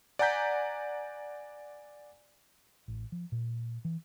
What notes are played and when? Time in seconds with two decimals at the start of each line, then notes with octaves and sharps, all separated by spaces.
0.19 D5 F#5 G#5 A#5 G6 B6
2.88 A1
3.12 F3
3.32 A#2
3.85 E3